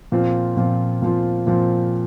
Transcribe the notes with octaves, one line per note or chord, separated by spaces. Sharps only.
A#2 F3 C4 F4
A#2 F3 C4 F4
A#2 F3 C4 F4
A#2 F3 C4 F4